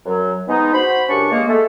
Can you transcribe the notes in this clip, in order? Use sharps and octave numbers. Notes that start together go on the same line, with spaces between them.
F#2 F#3
G#3 B3 D#4
F#4 C5 B5
C#2 F#2 C#4 D4 G4 C#6
G#3 A#3
G#3 A3 A4